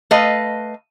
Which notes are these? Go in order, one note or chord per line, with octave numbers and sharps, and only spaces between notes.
A3 B4 D#5 F5